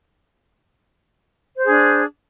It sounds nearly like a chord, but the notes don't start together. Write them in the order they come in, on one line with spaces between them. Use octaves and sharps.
C5 G#4 D4